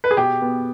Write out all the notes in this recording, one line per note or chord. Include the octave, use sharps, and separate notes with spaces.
B4
G#4
B2 G4
B3